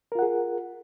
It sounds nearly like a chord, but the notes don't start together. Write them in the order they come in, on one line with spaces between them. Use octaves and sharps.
A#4 F4 F#5 G#4